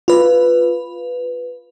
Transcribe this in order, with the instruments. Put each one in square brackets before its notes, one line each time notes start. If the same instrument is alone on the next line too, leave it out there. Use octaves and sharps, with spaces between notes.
[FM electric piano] F4 B4